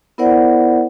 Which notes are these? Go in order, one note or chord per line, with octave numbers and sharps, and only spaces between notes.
B3 E4 A#4 C5 D5 F#5